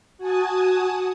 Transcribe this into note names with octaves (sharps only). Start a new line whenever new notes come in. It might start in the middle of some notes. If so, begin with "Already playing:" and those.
F#4 G#5 A5 D#6